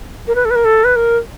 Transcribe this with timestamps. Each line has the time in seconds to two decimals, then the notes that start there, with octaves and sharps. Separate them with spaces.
0.28 A#4
0.35 B4
0.45 A4
0.50 B4
0.56 A#4
0.65 A4
0.84 B4
0.96 A#4